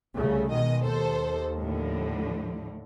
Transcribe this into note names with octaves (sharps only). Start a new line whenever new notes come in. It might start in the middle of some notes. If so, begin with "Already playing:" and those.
C2 C#3 A3
B2 D#3 G#3 D#5
D#2 A4 C5
A2 D3 F3